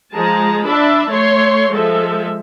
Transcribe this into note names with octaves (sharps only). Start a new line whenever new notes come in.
F3 G#3 G#4 A5 A#5
D4 E5 A5 B5
A3 C#5 C6
F3 G#3 A4 E5